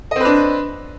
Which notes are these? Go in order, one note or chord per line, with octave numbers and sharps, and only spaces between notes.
C4 D4 B4 D#5